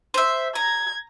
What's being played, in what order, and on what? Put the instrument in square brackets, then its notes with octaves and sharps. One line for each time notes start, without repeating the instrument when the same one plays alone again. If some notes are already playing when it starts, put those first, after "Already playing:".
[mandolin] C5 E5
[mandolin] A#5 [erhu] G#6